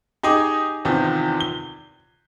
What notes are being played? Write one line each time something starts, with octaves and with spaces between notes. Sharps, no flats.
D#4 G4 G#4 D#5 G#5 D6
E2 C3 D#3 F3
G7